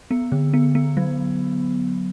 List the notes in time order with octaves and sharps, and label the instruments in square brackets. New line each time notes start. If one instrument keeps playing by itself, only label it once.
[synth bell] B3
D3
B3
B3
F#3